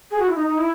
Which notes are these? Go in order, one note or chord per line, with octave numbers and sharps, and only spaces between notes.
G#4
F#4
E4
D#4
D#4
E4